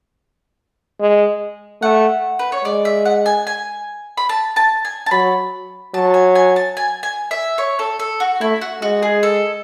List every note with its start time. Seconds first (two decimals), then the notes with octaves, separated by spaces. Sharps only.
1.00 G#3
1.82 A3 F#5
2.39 B4
2.52 C#5
2.65 G#3 D5
2.85 E5
3.05 F#5
3.26 G#5
3.47 G#5
4.17 B5
4.29 A5
4.56 A5
4.85 G#5
5.06 A5
5.11 F#3 B5
5.94 F#3 A5
6.14 G#5
6.35 G#5
6.56 A5
6.77 G#5
7.03 G#5
7.31 E5
7.58 C#5
7.79 A4
7.99 A4
8.20 F#4
8.41 A3 E4
8.61 F#4
8.82 G#3 F#4
9.02 G#4
9.23 A4